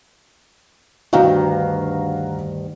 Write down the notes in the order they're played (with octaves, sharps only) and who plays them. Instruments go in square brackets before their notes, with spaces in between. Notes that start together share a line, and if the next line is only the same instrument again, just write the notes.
[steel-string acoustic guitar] D2 G2 D#3 [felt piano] F#4 F5 A#5